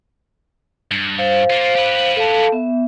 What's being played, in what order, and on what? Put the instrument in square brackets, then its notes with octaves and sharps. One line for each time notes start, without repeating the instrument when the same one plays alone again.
[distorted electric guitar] G2
[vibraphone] C5 F5
[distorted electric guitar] A#3 F4
G4 B4
[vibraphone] A4 F5 A5
B3 E5